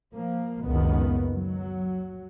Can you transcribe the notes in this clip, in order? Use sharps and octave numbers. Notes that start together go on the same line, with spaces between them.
F3 A#3
F#1 C#2 D#3 B3
F#3